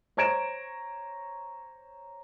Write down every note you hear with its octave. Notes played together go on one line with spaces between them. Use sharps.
C5 C#5 A#5 G#6 D7 E7